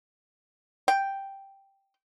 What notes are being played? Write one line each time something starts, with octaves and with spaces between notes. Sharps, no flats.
G5